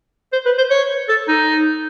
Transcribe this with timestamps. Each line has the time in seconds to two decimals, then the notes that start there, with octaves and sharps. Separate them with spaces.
0.33 C5
0.46 B4
0.58 C5
0.71 C#5
1.09 A4
1.28 D#4